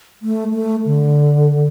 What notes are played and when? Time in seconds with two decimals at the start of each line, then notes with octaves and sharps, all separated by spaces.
0.22 A3
0.54 A3
0.86 D3